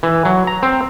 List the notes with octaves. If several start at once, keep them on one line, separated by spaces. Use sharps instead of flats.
E3
F#3
A#5
C4